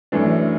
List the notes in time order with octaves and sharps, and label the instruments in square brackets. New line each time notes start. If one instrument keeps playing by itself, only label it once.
[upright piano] F#2 E3 A3 D4